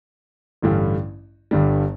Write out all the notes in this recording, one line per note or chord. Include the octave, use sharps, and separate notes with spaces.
A1 G2 D3 G3
G1 G2 D3 G3